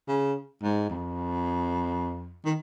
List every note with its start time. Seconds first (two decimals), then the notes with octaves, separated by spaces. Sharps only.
0.08 C#3
0.63 G#2
0.90 F2
2.45 D#3